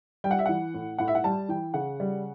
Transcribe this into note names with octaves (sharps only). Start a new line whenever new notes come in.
G3 G5
F#5
E5
E3 F#5
A2
A2 F#5
E5
F#5
G3 A5
E3 G5
C#3 F#5
G3